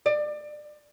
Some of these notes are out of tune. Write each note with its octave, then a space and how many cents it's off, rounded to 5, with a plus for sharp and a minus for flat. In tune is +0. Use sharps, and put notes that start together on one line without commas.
D5 +25